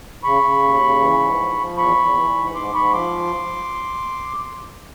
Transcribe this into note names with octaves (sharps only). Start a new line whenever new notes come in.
C#3 B5 C#6
C#3
D#2
C#3
E3
G#2
F3
F3
E2 B5 C#6
E2
E3
G#2
G#2 C6 D6
G#2 B5 C#6
F3 C6 D6